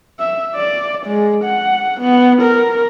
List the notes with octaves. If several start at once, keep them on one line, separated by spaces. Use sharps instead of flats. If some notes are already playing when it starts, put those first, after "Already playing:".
E5
D5
G#3
F#5
B3
A#4